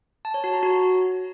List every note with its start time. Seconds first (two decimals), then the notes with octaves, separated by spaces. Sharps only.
0.25 A5
0.34 C#5
0.44 F#4
0.53 A#5
0.63 F#4